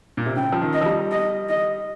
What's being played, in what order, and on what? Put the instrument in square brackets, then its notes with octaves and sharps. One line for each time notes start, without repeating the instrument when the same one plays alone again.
[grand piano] A#2
C3
[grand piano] C#3 [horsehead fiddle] G5
[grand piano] F3
D#3
[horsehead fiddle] D#5
[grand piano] F3
G3
[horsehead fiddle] D#5
D#5